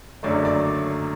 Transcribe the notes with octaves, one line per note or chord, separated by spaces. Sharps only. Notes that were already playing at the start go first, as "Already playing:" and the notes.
F#1 F#2 D3 F#3 A3 D5
D5